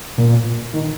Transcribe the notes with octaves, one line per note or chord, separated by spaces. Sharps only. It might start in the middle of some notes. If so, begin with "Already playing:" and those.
A#2
D#3